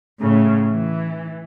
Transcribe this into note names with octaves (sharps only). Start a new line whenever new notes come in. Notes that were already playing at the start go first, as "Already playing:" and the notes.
A2 C#3
E3